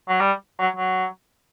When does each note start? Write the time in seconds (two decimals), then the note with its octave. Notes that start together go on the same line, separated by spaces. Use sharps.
0.09 F#3
0.20 G3
0.59 F#3
0.76 F#3